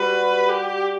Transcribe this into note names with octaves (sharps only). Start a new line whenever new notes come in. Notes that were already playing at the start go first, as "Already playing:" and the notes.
Already playing: G3 F#4 B4
G4